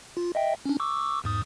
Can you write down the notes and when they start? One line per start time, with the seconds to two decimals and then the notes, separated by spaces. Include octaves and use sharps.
0.17 F4
0.35 D#5 E5 G5
0.65 C#4 D4
0.80 C#6 D6 E6
1.24 E2 G#2 D#6